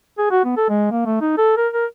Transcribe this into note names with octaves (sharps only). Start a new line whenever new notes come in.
G#4
F#4
B3
A4
G#3
A#3
A3
D#4
A4
A#4
A#4